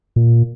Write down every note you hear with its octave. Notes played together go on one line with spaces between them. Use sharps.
A#2